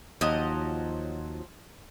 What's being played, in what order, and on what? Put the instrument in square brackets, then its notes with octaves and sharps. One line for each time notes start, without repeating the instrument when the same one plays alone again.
[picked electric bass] D#2 [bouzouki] F3 F#3 D#5